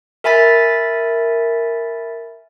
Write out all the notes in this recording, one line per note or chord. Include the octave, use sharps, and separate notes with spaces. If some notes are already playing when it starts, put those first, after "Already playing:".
A#4 E5 G#5 B5 A6 B6